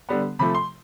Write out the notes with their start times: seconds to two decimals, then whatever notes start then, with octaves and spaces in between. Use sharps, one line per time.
0.09 D3 G3 B3
0.39 C3 F3 A3 B5
0.55 C6